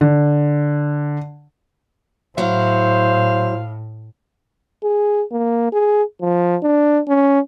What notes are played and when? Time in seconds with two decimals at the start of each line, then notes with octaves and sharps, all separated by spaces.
0.01 D3
2.38 A2 F#3 E4 C5 F5
4.83 G#4
5.32 A#3
5.72 G#4
6.22 F3
6.63 D4
7.08 C#4